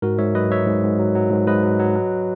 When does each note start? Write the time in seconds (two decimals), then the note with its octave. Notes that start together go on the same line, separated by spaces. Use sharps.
0.02 G#2 F#4 A#4
0.18 G#2 C#5 E5
0.35 F#3 B4 D#5
0.51 F#3 C#5 E5
0.67 G#2
0.83 G#2
0.99 F#3
1.15 F#3
1.31 G#2
1.47 G#2 B4 D#5
1.63 F#3
1.79 F#3
1.96 F#3